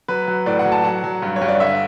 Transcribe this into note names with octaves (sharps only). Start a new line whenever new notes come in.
F#3 B4
F#3
A2 D5
F#5
F#3
A5
F#3 F#5
F#3
G2
C#5
G2
D5
D3 E5